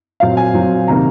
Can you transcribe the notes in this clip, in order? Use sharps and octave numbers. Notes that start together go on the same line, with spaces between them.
A#2 F#3 C4 F5
G#5
A#2 F#3 C4
C3 D#3 A#3 A#5